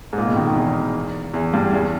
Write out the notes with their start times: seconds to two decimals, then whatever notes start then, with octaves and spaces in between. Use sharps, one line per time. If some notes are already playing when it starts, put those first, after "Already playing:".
0.13 G#2
0.18 A#2
0.27 B2
0.36 D#3
0.47 D#3
0.56 E2
1.34 E2
1.53 G2
1.73 E2